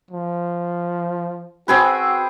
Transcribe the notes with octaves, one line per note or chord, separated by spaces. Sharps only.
F3
C4 F#4 G#4 B4